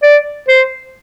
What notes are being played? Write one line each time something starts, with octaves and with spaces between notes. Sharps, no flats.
D5
C5